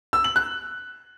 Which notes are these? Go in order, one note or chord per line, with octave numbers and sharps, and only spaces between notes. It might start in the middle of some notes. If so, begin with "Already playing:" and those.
E6
F#7
F#6